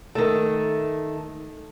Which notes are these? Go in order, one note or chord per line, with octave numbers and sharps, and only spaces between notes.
D#3 A3